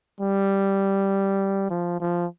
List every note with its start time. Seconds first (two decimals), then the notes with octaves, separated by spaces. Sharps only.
0.21 G3
1.70 F3
2.00 F3